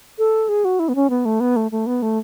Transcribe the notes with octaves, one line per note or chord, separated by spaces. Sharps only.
A4
G#4
F#4
E4
B3
C#4
B3
A3
B3
A3
A3
B3
A3